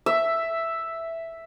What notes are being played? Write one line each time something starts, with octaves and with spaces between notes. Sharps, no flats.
E5